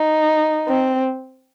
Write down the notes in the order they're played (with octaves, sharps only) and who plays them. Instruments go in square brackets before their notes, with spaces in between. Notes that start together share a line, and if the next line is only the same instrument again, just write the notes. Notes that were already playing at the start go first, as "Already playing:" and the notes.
Already playing: [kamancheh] D#4
C4